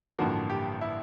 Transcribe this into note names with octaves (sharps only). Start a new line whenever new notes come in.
A1 G2 D3 F3 A#3 F#4
G4
E4